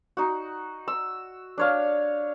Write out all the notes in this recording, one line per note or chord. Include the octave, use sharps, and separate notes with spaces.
D#4 F#4
E6
D4 C#5 F5